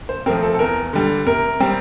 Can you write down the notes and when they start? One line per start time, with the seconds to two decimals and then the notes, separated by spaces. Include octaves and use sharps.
0.09 C5
0.26 F3 A3 C4 A#4
0.43 A4
0.54 A4
0.59 E2 A#4
0.93 D3 G3
1.27 C3 A#4
1.60 G3 C4